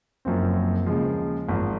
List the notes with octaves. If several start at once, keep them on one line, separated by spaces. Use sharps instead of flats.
F#1 F#2 F3 C4
D#2 C#3 F3 G#3
G#1 G#2 F3